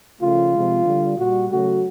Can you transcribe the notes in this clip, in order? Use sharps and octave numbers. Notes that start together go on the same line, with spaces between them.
C#3 F3 A3 F4
C3 F3 G#3
D3 G3
A#2 G3 F#4
C#3 F#3 A3 F#4